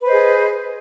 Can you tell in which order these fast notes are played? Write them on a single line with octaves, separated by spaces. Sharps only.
B4 C5 D#5 G#4